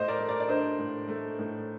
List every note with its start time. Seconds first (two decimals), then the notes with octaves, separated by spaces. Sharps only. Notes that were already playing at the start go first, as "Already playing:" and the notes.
Already playing: A2 C5 D#5
0.08 A#4 D5
0.19 A3
0.28 A#4 D5
0.40 D5
0.48 D4 C5 D#5
0.78 A2
1.08 A3
1.39 A2